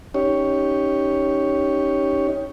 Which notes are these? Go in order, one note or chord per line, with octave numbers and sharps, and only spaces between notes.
C#4 D#4 G4 C#5